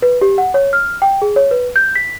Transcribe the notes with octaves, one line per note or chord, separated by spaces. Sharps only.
B4
G4
F#5
C#5
F6
G5
G#4
C#5
B4
G6
B6